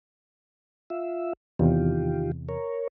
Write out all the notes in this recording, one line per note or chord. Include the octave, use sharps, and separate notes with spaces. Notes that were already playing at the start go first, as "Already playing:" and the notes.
F4 E5
E2 C3 D#3 F4 G4
A#4 C#5